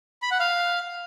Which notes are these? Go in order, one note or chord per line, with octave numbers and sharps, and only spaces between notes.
B5
F#5
F5